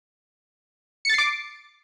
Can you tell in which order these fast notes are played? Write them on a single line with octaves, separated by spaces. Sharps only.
C#7 A6 C7 D6